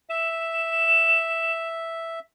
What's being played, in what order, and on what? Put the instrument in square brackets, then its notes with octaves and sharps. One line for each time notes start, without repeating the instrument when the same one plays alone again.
[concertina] E5 [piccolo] E7